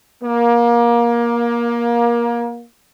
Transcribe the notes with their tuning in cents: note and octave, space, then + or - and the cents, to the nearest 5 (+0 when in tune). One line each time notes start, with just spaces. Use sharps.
A#3 +25